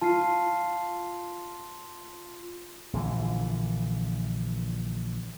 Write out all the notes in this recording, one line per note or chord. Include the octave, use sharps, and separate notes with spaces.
F4 A5 C7
A#1 D3 E3